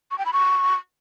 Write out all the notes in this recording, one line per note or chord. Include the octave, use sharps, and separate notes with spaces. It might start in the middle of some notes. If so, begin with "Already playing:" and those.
C#6
G5
B5
C#6